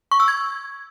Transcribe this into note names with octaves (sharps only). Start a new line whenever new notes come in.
C#6
E6
G#6